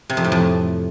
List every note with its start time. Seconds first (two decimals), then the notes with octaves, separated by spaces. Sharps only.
0.10 C3
0.17 F2
0.24 A2
0.32 F2